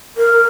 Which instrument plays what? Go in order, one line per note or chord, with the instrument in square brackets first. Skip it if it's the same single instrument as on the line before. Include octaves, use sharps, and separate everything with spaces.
[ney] A#4